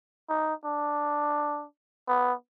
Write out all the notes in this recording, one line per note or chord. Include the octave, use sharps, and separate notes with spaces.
D#4
D4
B3